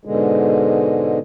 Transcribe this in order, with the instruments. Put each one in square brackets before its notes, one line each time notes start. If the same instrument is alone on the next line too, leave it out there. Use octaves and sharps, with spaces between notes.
[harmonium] G#2 B2 D3 G#3